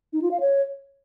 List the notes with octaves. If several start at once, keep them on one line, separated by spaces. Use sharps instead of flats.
D#4
F4
F5
C#5